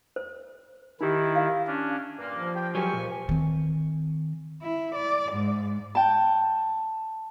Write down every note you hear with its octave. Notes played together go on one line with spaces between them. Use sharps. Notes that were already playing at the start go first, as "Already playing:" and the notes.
C5
D#3 D#4 E4 G4
F5
C#4 D4
G2 A#2 A#3
F3
G4 G5
C#2 F#3 G4 G#5 C#6
A#2
D#3 C4
E4
D5
G#2
G5 A5